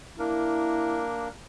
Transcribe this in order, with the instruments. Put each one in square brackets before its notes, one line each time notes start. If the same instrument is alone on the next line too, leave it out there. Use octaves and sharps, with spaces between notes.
[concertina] A#3 D4 A#4 [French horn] E4